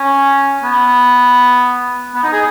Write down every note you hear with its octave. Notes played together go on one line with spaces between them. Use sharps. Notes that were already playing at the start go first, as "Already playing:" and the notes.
Already playing: C#4
B3
B3
D#4
G#4